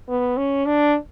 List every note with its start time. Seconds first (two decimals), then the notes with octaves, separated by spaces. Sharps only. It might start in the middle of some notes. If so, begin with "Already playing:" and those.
0.09 B3
0.37 C#4
0.66 D4